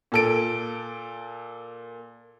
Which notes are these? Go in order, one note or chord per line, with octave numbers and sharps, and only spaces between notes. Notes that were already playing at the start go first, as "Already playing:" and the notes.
A#2 A4 D7